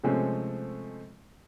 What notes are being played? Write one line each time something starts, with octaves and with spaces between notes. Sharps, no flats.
C3 F3 G#3 A3 C4 C#4